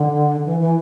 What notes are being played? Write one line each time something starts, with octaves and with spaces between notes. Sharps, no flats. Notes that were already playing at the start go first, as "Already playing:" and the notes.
Already playing: D3
E3
E3